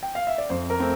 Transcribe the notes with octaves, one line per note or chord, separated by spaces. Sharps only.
G5
F5
E5
D5
F2 C5
A#4
A3 C4